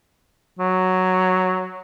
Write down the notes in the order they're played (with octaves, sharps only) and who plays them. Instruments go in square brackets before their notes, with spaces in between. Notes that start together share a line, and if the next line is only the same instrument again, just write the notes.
[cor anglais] F#3